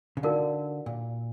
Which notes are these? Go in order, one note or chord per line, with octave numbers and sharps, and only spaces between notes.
C#3
D3 D#4 F#4 A#4 D5 F5
A#2